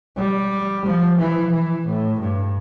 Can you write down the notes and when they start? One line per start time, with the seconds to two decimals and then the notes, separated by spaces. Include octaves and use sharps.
0.17 G3
0.85 F3
1.18 E3
1.52 E3
1.86 A2
2.20 G2